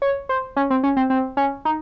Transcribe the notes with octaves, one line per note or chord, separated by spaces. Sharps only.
C#5
C5
C#4
C4
C#4
C4
C4
C#4
D#4